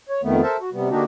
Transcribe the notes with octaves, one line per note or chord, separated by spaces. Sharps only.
C#5
F2 D#3 A3 B3
A4 A#4 C5 E5 A5
F#4
C3 G3 B3
D3 A#3 D4 D#4 F#4 G4